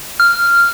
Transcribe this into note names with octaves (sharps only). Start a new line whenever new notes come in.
F6